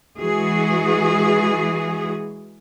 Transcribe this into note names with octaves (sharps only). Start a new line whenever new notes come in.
E3 G#3 F#4 G#4